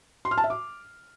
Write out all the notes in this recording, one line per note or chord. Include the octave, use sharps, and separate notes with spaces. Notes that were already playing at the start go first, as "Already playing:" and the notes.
C6
F6
A5
E5
D6